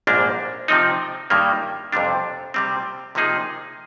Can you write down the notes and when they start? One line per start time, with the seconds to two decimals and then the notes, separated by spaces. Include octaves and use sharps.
0.07 A#1 G#2 G3 A#3 D4
0.68 C3 F3 C4 D#4
1.30 G2 D#3 G3 A#3
1.92 F2 C3 G3 D4
2.54 C3 G3 C4
3.15 C3 F3 A#3 D#4 G#4